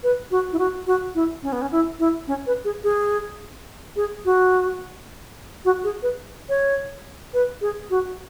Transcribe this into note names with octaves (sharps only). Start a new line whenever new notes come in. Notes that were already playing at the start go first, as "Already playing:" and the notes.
B4
F#4
E4
F#4
F#4
E4
C#4
B3
C#4
E4
E4
C#4
B4
G#4
G#4
G#4
F#4
F#4
G#4
B4
C#5
B4
G#4
F#4